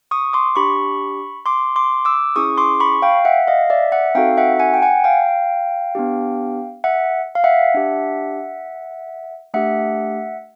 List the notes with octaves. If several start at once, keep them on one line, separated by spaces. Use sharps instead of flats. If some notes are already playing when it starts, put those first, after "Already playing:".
C#6 D#6
C6 D6
D4 G4 B5 C#6
C6 D6
C6 D6
D6 E6
C#4 E4 G#4 C#6 D#6
C6 D6
B5 C#6
F5 G5
E5 F#5
D#5 F5
D5 E5
E5 F#5
C4 D#4 F#4 A4 F5 G5
E5 F#5
F#5 G#5
G5
F#5 G#5
F5 G5
B3 D4 G4
E5 F#5
F5
E5 F#5
D4 G4
A3 D4 G4 E5 F#5